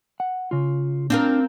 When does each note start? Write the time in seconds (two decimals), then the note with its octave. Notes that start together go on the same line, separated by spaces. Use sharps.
0.20 F#5
0.51 C#3 F4
1.10 C4 D4 F4 A#4